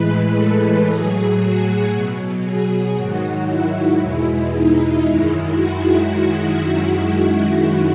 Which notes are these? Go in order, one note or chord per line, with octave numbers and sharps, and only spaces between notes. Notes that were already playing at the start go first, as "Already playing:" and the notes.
Already playing: A2 E3 G#3 B4
A4
A2 F#3 G#4
F#4
B2 F#3
G#4
G#2 D#3 F#3 F#4
E4
E2 B2 G#3
D#4
F#2 D#3 G#3 E4
F#4